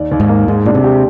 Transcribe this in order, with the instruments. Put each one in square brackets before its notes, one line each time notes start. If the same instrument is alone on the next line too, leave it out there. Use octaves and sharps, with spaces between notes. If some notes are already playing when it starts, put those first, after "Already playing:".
Already playing: [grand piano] D#2 D5
D#2
[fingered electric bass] G#2
[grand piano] A#3
[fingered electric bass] G#2 [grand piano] G#3
[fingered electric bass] A#2 [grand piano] D4
[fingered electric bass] C3
[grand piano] G4